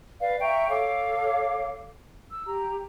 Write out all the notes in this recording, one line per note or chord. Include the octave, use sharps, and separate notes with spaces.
B4 D5 F5
E5 G5 A#5 C#6
A4 C#5 F5 D6
E6
G4 A#5